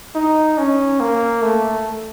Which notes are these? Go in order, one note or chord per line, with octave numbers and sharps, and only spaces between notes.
D#4
C#4
A#3
A3